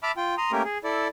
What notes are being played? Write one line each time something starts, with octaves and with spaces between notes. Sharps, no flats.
E5 A5 B5 D6 F6
F4 G5
A#5 C6 D#6
A3 A#3 C#4 G4 A#4
G#4
E4 A4 D5